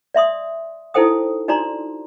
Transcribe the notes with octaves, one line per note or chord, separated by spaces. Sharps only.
D5 E5 C6 D#6
D#4 E4 A4 C5 G5 D#6
D4 D#4 F#4 D5 A#5 C6